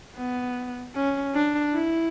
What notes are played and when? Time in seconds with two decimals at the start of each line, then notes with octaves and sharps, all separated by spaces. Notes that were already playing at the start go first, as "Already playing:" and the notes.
0.17 B3
0.95 C#4
1.35 D4
1.74 E4